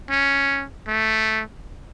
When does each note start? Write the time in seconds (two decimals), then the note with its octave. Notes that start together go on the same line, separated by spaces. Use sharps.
0.11 C#4
0.88 A3